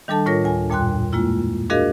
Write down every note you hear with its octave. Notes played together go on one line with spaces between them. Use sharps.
D#3 G3 D4 A4 A5
A2 F4 A#4 C#5 A#6
D2 G#5
F2 A#2 G3 G5 C6 F#6
G#3 A#3 E4 F4
D4 F#4 G#4 A#4 D#5 F5